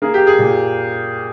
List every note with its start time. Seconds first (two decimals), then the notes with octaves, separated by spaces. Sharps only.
0.02 A#3 G#4
0.14 G4
0.27 G#4
0.39 A#2